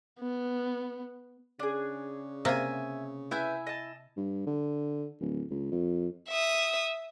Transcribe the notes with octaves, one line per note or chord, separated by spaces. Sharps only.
B3
C#3 D4 G#4
C3 A#3 E5 G#5
E4 B4 E5 G#5 G6
D#5 A5
G2
D3
D1
C#2
F2
E5 D#6